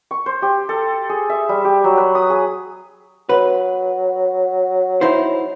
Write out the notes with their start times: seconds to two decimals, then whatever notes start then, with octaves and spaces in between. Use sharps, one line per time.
0.11 C#6
0.26 C5
0.42 G4
0.69 A4
1.09 G#4
1.29 E5
1.49 G3
1.65 G4
1.84 F#3
1.97 B4
2.15 D#6
2.30 G#4
3.29 F#3 B4
5.01 D#4 E4 C5